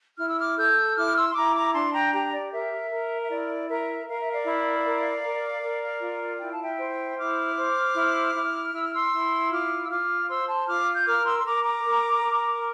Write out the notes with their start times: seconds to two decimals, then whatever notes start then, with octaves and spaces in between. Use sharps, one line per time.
0.18 E4 F6
0.28 E6
0.39 D6 F6
0.57 A4 E6 G6
0.97 E4 D6 F6
1.16 C6 E6
1.29 C6
1.35 E4 A#5 D6
1.55 A#5 D6
1.74 D4 A5 C6
1.93 G5 A#5
2.13 G4 G5 A#5
2.33 D5
2.51 A#4 E5
2.90 A#4
3.22 E5
3.29 E4 D5
3.69 A#4 E5
4.07 A#4 F5
4.20 E5
4.32 D5 F5
4.46 E4
4.85 A#4
5.24 A#4
5.63 A#4
6.01 F4
6.40 E4 G5
6.51 A5
6.62 E5 G5
6.78 C5
7.18 E4 D6 F6
7.56 C5
7.95 E4
8.35 E4
8.74 E4 E6
8.83 F6
8.93 C6 E6
9.12 E4
9.51 F4 D6 F6
9.84 E6
9.89 F4 D6 F6
10.28 C5 C6 E6
10.48 A5 C6
10.67 F4 D6 F6
10.95 G6
11.06 A#4 D6 F6
11.25 C6 E6
11.38 C6
11.45 A#4 A#5 D6
11.64 A#5 D6
11.84 A#4
12.22 A#4